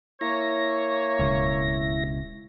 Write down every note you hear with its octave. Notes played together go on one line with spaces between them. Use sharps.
A#3 E4 C#5 A#6
D1 C#2 B2